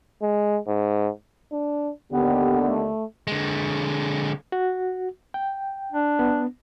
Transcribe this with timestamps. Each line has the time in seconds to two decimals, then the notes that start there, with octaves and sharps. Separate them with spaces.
0.22 G#3
0.68 G#2
1.52 D4
2.12 D#2 D3 B3 G4
2.65 A3
3.27 D3 G#3
4.52 F#4
5.34 G5
5.92 D4
6.19 B3